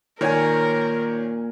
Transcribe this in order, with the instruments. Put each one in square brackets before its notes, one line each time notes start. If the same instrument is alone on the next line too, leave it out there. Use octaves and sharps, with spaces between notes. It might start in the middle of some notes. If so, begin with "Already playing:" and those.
[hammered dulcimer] A#2 G#5 [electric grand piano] D#3 C#5 [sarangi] A#4